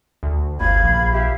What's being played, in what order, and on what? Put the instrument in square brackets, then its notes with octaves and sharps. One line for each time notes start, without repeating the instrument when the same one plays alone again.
[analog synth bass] D2
[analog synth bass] G1 [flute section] F5 B5 G#6
[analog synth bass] A#1
[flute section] G4 E5 F5